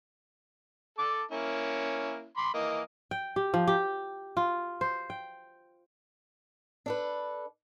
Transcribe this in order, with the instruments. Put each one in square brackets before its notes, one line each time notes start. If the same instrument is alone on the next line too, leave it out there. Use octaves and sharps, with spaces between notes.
[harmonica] A4 A5 D6
A#3 C#4 E4
B5 C6 D6
E3 A#3 D#5
[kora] G5
G4
F3
G4
F4
C5
G5
[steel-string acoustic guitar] D4 A4 B4